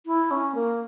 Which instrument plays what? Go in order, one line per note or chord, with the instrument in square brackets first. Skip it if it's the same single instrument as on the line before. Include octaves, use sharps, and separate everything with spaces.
[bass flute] E4
C#4
A#3